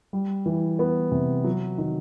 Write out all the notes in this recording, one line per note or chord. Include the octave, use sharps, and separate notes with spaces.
G3
E3
B3
C3
F#3
D#3